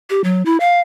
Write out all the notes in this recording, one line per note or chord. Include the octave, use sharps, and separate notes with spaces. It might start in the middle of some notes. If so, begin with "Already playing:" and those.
G4
F#3
E4
F5